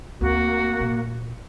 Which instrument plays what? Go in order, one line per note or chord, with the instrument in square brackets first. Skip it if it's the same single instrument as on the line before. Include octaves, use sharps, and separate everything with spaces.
[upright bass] D2 C4 [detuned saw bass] A#3 [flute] F#4
[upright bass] A#2